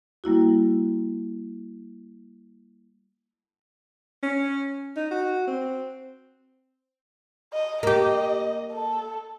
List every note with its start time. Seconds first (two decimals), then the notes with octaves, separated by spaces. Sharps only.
0.24 G3 A#3 E4 F#4
4.23 C#4
4.96 D#4
5.11 F#4
5.47 C4
7.53 D#5
7.83 A#3 G4 D#5
8.73 A4